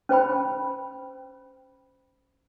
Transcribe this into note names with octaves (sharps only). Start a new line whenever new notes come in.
C#4 C5 G5 B5